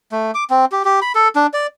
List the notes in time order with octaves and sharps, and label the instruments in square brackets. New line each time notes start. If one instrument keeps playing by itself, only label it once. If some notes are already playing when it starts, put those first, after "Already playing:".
[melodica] A3
D6
C4
G4
G4
B5
A4
D4
D5